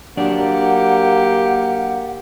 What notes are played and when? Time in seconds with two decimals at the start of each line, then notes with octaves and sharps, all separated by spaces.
0.17 F#3 A#3 D4 G4 D5 F#5